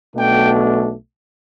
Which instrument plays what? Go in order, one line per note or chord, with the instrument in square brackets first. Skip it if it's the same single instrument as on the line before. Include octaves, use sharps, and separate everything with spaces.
[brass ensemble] B1 B2 A3 D4 G5